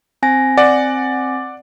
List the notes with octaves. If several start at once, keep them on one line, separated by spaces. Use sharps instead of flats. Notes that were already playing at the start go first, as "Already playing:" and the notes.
C4 G#5 A#6
D5 F#5